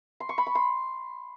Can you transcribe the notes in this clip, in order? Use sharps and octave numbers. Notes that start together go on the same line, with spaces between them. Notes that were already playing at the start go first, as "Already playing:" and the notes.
C6
C#6
B5
C#6
C6